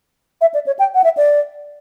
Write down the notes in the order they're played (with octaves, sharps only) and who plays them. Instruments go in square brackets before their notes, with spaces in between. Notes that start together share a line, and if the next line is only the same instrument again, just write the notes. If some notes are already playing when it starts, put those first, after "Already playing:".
[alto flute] E5
D5
C#5
G5
F#5
E5
D5